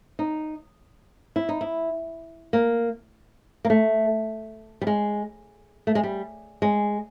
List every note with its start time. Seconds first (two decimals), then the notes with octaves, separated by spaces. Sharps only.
0.19 D#4
1.36 E4
1.49 D#4
1.61 E4
2.53 A#3
3.65 A#3
3.70 A3
4.81 G3
4.87 G#3
5.87 A3
5.95 G#3
6.03 G3
6.62 G#3